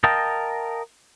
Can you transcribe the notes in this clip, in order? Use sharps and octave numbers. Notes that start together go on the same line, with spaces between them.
A#4 D#5 F5 G5 A5